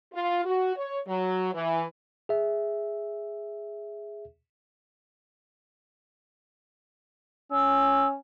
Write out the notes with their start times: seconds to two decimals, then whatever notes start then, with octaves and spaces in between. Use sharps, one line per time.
0.14 F4
0.45 F#4
0.77 C#5
1.08 F#3
1.54 E3
2.29 G#4 E5
7.52 C#4 E6